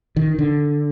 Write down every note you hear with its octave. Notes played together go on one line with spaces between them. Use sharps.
D#3
D3